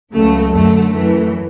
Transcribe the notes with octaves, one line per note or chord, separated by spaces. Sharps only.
C#2 C#3 F#3 A3
F#2 D3 F#3 A3
F#2 E3 A3